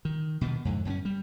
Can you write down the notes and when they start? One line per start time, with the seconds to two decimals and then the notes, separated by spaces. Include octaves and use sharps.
0.05 D#3
0.41 B2 D#3 B3
0.65 F2 G#2 D3
0.85 F#2 B3 C#4
1.05 G3